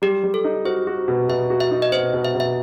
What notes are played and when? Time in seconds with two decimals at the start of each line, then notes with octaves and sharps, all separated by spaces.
0.02 G3 G4
0.23 G3
0.34 A4
0.44 D#4
0.65 F#4 C5
0.87 F#4
1.08 B2
1.29 B2 E5
1.50 F#4
1.60 E5
1.71 D#4
1.82 D#5
1.92 B2 C5
2.13 B2
2.24 E5
2.35 B2
2.40 E5